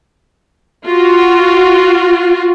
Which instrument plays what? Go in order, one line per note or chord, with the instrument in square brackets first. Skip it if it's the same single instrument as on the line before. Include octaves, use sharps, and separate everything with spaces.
[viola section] F4 F#4